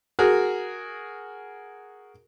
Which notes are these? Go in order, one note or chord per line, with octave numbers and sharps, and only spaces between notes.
F#4 G#4 A#4